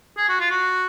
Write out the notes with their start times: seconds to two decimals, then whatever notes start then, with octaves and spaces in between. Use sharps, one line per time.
0.17 G#4
0.29 F#4
0.40 F4
0.51 F#4